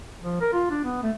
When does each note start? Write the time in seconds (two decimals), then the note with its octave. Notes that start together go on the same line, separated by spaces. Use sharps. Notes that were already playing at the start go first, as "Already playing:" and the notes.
0.22 F3
0.41 A#4
0.53 F4
0.71 D4
0.85 B3
1.03 A3